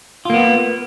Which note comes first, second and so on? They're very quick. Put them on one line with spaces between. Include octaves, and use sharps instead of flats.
F4 A#3 B3